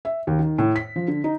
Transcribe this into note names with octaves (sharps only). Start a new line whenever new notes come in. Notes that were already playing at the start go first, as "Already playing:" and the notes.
E5
D#2
D#3
A2
B6
F3
D3
D#4